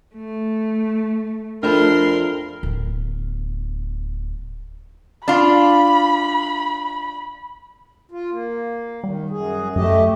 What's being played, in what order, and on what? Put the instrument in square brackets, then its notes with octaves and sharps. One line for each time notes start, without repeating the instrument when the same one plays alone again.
[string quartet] A3
[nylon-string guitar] F2 A3 [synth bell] D4 D5 B5 [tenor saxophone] A#4 [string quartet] C6
[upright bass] D1 B3
[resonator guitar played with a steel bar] D4 F4 [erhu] B5
[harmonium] F4
A#3
[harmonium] D#3 [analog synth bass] G3
[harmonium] F#2 G#4
[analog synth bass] F#2 [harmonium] A3 G4 D#5